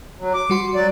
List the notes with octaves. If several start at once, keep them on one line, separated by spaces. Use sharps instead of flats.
F#3
D6
G3 F#4 C6
F#3 D5